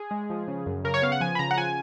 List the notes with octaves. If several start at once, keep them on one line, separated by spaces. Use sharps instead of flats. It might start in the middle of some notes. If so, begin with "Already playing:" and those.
Already playing: G#4
G#3
F3
C#3
F#2
C#3 A#4
C#5
B3 F5
F#5
F3 G#5
B5
C#3 A#5
F#5
F4 G#5